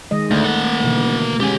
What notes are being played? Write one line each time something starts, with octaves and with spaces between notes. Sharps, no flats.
D#3 G#3 D#5
D2 A3
A#3 F#5
B2 D3 E3
G#3 C#4 G4 G#5